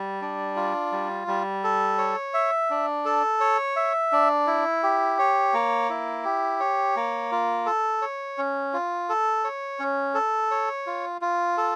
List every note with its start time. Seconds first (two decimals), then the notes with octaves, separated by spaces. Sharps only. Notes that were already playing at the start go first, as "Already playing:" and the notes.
Already playing: G3
0.22 D4
0.56 F4
0.92 G3
1.28 G3
1.64 A4
1.98 C#5
2.34 E5
2.70 D4
3.05 A4
3.41 C#5
3.76 E5
4.12 D4
4.47 E4
4.83 G4
5.19 C#5
5.54 A#3
5.90 E4
6.25 G4
6.60 C#5
6.96 A#3
7.32 F4
7.66 A4
8.02 C#5
8.38 C#4
8.74 F4
9.09 A4
9.44 C#5
9.79 C#4
10.15 A4
10.51 C#5
10.87 F4
11.21 F4
11.58 A4